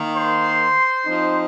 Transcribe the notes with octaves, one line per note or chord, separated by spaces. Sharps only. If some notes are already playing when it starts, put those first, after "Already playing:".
Already playing: D#3 A#3
C5 C6
F3 C4 D#4